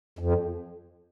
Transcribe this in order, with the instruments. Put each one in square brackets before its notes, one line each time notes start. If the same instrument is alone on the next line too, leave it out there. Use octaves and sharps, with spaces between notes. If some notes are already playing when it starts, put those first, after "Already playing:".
[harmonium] F2